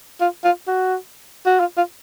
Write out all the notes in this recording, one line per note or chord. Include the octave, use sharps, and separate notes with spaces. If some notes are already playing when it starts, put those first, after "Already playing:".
F4
F4
F#4
F#4
F4
F4